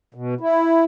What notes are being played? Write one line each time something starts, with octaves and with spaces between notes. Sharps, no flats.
B2
E4